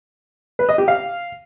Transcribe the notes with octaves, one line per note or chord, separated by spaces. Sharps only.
B4
D#5
G4
F5